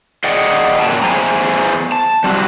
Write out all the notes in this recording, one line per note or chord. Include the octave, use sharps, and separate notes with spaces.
G#4 D5 D#5 F#5 G5
F#2 A#2 F#3 G5 A5
E2 C#3 G#4 C5 G#5 A#5
A5
G3 C4 F#4